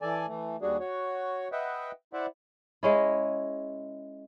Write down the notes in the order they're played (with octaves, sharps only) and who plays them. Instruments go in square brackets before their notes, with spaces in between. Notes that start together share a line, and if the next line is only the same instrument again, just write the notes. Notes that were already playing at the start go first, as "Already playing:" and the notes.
[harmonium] E3 A4 D5 G#5 A5
E3 A3
D#2 G3 D4 F#4 G#4
F#4 C#5
B4 D#5 E5 F#5 G5
E4 C5 D5 E5 F#5
[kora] G#3 C#4 E4